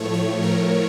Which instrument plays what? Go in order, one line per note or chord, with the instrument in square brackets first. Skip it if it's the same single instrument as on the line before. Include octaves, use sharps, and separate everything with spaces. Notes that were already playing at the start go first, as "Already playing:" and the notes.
Already playing: [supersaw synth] A2 F3 A3 C#5
C#5
A#4